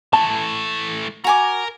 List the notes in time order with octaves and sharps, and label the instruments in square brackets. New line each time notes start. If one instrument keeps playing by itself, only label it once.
[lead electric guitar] E3 A3 [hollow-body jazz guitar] A5
[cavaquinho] F#4 G#5 D6 [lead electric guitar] A#4 A#5